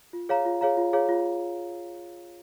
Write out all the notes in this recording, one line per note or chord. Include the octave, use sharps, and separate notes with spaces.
F4
G#4 C#5 F5 A#5
F4
G#4 C#5 F5 A#5
F4
G#4 C#5 F5 A#5
F4